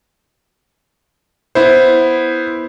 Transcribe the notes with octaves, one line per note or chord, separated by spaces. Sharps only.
B3 E4 C5